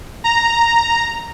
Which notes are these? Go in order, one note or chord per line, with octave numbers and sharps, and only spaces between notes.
A#5